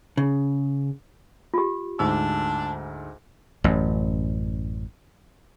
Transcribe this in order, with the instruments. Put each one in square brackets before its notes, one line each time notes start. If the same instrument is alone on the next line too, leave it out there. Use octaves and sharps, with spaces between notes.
[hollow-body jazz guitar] C#3
[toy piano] F4 G4
[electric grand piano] D2 G#2 E6 [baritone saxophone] D4
[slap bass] A1 F#2